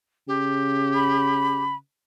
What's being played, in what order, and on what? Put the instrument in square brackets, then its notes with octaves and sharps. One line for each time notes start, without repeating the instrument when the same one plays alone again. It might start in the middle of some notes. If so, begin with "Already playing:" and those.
[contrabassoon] C#3 [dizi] G4
[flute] B5